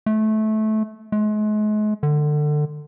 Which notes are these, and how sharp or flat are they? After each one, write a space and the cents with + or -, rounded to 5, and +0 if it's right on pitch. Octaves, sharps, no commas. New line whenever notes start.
A3 -20
G#3 +40
D3 +25